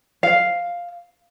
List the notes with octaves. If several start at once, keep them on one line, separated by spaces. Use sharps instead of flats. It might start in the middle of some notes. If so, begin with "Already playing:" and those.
F5